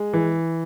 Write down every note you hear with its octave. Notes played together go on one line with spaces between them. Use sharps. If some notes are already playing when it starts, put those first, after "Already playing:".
Already playing: G#3
E3